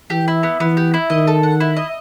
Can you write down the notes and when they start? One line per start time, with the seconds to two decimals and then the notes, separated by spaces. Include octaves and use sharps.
0.10 E3 G4
0.28 E4
0.43 B3
0.60 E3 B3
0.77 G4
0.94 E4
1.10 D#3 D#5
1.27 A4
1.43 F#5
1.60 E4
1.77 D#5